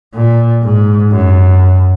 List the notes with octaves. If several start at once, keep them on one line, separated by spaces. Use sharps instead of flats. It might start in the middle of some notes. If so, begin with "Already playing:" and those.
A#2
G#2
F#2